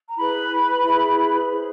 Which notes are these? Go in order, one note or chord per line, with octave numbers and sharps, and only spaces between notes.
A#5
E4 G#4 B4 B5
E4 G#4 B4
E4 G#4 C5